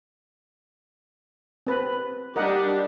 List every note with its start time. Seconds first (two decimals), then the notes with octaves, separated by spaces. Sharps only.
1.67 C4 B4
2.36 G3 D4 G4 A#4 D#5 F#5